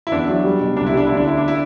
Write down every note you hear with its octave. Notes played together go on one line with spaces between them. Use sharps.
E4
E2 D4
F#3
G3
B2
C2 D4
E4
G3 D4
D2 E4
D4
D3 E4
C4 D4
E4